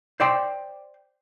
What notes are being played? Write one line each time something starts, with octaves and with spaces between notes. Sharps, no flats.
C5 D5 G5 C6